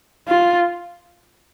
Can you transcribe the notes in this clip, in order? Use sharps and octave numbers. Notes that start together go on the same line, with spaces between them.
F4